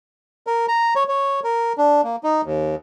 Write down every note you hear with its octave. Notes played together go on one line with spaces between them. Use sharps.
A#4
A#5
C#5
C#5
A#4
D4
A#3
D#4
D#2